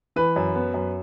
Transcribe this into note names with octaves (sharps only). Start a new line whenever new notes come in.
E3 B4
F#2
B3
F#2